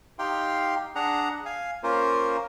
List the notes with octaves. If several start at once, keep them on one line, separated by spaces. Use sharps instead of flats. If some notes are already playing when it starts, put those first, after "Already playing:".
D#4 G4 F5 G5 C6
D4 G#4 F#5 A#5
F5 G#5
A#3 C#4 F4 A#4 C5